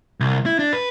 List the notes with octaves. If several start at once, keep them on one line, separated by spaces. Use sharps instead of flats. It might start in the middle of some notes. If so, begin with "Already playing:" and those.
C2
E4
D4
B4